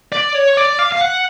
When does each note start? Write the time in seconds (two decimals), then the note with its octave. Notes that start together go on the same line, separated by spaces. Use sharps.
0.12 D5
0.35 C#5
0.57 D5
0.79 F5
0.92 F5
1.01 F#5